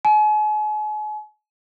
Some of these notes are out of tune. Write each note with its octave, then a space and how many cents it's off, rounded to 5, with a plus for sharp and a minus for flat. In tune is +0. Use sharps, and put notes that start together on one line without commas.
G#5 +40